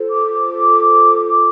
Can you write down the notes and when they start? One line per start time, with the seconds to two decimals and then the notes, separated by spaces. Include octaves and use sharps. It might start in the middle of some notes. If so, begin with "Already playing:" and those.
Already playing: F4 A4 C5
0.11 D6